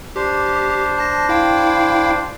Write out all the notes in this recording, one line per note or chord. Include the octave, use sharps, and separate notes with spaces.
D4 G4 C5
A5 A#6
E4 F5 G5